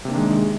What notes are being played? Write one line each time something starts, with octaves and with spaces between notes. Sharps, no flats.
C3 D#3 G#3 A#3 D4